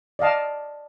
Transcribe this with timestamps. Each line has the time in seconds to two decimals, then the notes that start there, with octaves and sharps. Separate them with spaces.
0.19 D5 D#5 F5 A5